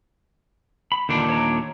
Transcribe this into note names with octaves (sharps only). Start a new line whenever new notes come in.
B5
D#2 A#2 D3 D4
C#5 A#5